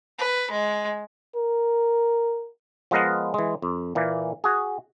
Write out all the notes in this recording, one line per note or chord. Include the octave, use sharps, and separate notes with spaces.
B4
G#3
A#4
F3 G#3 B3 A#4 D#5 F#5
E3 G#3
F2
A#2 E3 A#3
F#4 G#4